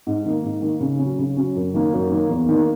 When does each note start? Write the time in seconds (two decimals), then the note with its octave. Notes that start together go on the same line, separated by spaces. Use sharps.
0.07 G#2
0.26 D#3 A#3
0.44 G#2
0.62 D#3 A#3
0.80 C#3
0.99 C#4
1.04 F#3
1.19 C#3
1.37 F#3 C#4
1.56 F#2
1.74 D#3 A#3
1.93 F#2
2.11 D#3 A#3
2.29 E2
2.49 D#3 A#3